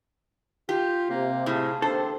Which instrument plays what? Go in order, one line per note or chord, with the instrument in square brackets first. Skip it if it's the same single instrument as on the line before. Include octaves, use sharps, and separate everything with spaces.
[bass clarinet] F4 [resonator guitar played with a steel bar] G4
[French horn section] C3 [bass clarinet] A#3
[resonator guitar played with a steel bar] A2 [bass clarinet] C#3
[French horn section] D#2 C4 [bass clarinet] D4 [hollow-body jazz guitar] A4 [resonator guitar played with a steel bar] C5